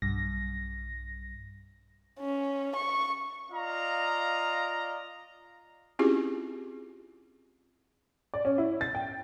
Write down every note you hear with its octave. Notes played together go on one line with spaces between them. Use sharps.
B1 G2 A#6
C#4
C#6
F4 D5 D#5 F5 A#5
C4 C#4 E4 F4 G4 G#4
D5
C#4
E4
A6
G5